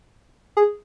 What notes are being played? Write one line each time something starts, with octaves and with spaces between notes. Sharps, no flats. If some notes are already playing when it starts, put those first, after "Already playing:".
G#4